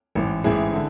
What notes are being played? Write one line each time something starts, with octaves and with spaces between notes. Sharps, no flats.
A1 G#2 E3
A1 G#2 E3 E4 G#4
D3